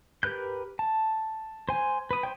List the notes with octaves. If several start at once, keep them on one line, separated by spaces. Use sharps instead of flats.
G4 A#4 B4 F#6 G6
A5
C5 G#5
B4 D#6
C5 C#5 G5